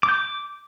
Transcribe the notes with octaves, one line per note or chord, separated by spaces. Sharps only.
D6
G6
D6